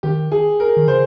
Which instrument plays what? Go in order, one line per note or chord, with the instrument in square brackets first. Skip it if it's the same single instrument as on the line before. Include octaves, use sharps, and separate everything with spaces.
[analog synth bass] D#3 [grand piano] G4
[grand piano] G#4
A#4
[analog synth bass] D#3
[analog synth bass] C#3 [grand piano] C5